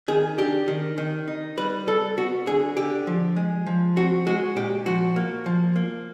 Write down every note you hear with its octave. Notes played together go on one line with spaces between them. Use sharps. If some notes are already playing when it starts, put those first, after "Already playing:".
D#3 G#4
D4 G4
D#3
D#3
D#4
G3 B4
G3 A4
B3 F#4
D3 G#4
D3 G4
F3
G#3
F3
C4 F#4
G#3 F#4
A#2 G4
F3 F#4
A#3
F3
A#3